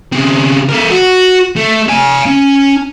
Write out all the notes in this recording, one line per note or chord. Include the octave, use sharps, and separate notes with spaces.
C#3 C4
A3 A#4
F#4
A3
F5 G#5
C#4